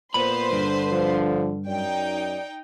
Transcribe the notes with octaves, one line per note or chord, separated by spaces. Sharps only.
A#2 B3 B4 C5 B5 C6
G2 D3
F3
F#2 D#4 D5 G5